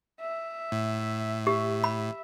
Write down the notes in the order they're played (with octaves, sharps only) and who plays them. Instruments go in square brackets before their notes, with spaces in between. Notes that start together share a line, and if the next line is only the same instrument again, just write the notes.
[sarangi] E5
[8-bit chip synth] A2
[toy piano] G4 [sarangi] E5
[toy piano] B5